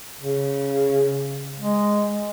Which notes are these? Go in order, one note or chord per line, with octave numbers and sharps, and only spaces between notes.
C#3
G#3